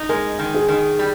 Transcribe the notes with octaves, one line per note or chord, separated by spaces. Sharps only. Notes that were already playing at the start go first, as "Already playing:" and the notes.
Already playing: D#4
G#3 A#4
D#3
G#4
D#3
G3